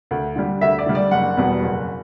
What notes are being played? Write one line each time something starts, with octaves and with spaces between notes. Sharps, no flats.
D2
D3 G3
D2 E5
D5
D3 G3
D5
F#1 F#5
E2 B2 G3
F#1